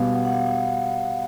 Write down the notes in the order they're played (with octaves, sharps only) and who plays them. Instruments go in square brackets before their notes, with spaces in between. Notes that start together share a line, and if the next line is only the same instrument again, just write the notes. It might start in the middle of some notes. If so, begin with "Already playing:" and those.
Already playing: [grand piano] B2 G3 B3 [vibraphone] F5
[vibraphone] F#5
F#5
F5